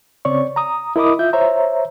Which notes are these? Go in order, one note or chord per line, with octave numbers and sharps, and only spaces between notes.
C#3 C4 C#5 D5 C#6
A#5 D#6
E4 A#4 D#5 B5 D6 D#6
F4 E5 G6
C5 C#5 E5 A#5